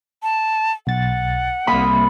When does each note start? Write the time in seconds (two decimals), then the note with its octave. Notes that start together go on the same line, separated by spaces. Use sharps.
0.23 A5
0.87 B1 F#5 A6
1.67 C2 A#3 E5 B5 C6 D#6